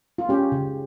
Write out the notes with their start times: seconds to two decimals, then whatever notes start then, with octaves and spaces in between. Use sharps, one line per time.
0.18 F4
0.29 C#4 G4
0.52 C#3